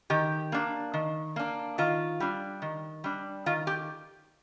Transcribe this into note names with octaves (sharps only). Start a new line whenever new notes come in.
D#3 G4
A#3 D4
D#3
A#3 D4
D#3 F4
G3 D4
D#3
G3 D4
D#3 F4
G4